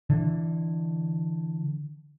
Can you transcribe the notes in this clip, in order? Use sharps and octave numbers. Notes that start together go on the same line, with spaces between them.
D3 E3